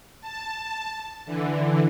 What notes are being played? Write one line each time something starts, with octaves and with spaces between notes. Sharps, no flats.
A5
D3 E3